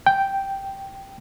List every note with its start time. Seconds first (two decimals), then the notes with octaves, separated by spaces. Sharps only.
0.06 G5